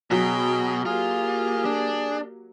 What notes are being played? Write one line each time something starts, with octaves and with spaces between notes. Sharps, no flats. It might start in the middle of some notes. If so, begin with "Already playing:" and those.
B2 F#3 G#4 G5
A#3 F4 G4 G#4
D4